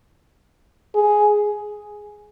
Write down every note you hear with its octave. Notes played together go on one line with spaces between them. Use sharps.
G#4